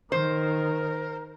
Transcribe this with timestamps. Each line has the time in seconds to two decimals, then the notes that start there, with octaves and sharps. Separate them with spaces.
0.12 D#3 A#4 C5